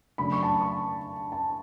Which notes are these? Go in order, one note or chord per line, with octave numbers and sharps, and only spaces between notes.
C#3 F#3 A3 D4 B5
C#6
A5
B5
C#6
A5